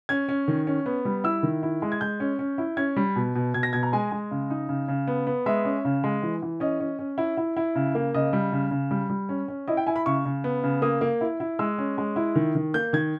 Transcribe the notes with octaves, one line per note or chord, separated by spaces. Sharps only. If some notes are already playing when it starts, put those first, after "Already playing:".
C#4 G#6
C#4
D#3
C#4
B3
G3
E4 E6
D#3
E4
G#3
G#6
G#3 G6
C#4
C#4
E4
C#4 G#6
G3
B2
B2
B2 G#6
A#6
B2 G#6
A#5
G#3 G#5
G#3
C#3
D#4
C#3
C#3
B3
B3
G#3 E5
C#4
C#3
G#3
E3
E3
C#4 D#5
C#4
C#4
E4
E4
E4
C#3
A#3
C#3 D#5
G3
C#3
C#3
G3
G3
C#4
C#4
E4 D#5
G5
E4 G#5
B5
C#3 C#6
C#3
B3
C#3
A#3 D#6
A#3
E4
E4
G#3 E6
C#4
G#3
E4
D#3
D#3
A#3 G6
D#3 G#6